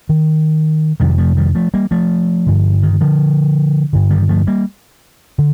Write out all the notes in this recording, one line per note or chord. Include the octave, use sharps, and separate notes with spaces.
D#3
F2 C3 D#3 G3
F3 A3
D#3 G3
F3 A3
G3 A#3
F3 A3
G2 D3
D#3
D3 F3
G2 D3
D#3 G3
F3 A3
G3 A#3
D3